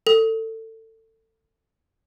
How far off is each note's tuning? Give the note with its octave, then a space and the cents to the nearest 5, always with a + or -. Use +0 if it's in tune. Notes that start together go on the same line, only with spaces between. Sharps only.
A4 +25